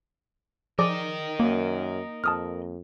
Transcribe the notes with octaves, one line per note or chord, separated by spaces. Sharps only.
F3 G#4 A#4 D5 D#5 D6
F#2 A#3
F2 A5 D#6 F6